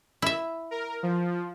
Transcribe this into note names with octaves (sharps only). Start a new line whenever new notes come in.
E4 E5
A#4
F3